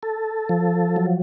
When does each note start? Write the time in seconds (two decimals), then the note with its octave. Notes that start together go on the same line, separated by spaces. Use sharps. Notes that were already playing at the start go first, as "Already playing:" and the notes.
0.03 A4
0.49 F3
0.96 F#3